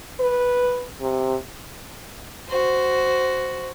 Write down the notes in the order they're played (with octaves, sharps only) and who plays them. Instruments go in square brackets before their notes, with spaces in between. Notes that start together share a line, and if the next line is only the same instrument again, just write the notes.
[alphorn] B4
C3
[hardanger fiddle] F#4 C5